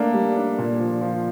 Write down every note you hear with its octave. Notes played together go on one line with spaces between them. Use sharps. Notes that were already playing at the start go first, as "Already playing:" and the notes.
Already playing: A3 A#3 D4
G3
D4
A#2
F3
F3